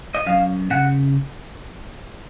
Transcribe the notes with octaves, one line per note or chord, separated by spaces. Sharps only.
D#5
F#2 F5
C#3 F#5